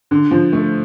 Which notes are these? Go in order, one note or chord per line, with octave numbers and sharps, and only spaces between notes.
D3
F3
A3